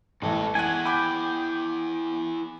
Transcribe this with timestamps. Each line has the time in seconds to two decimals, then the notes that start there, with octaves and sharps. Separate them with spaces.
0.22 A1 G#2 E3 A4
0.55 E4 G#4 F#5 G#5 G#6 D#7
0.85 G5 B5 D6